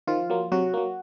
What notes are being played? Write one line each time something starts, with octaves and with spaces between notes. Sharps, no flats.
D#3 F3 F4
F#3 A#3
C3 F#3 F#4
F#3 A#3